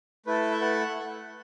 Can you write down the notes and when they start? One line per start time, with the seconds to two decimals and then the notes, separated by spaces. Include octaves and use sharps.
0.26 A3 E4 A4 B4
0.51 E5
0.61 F#5